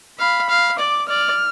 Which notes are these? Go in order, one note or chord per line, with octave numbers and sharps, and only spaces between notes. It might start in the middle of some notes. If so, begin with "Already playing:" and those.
F5 B5
F5
D5 D6
D5 F6